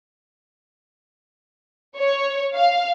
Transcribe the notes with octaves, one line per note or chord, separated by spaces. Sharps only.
C#5
F5